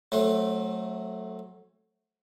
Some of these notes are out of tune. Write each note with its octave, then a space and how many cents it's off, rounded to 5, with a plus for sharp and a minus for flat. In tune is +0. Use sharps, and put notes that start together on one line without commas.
F#3 +0 A3 +0 C4 +30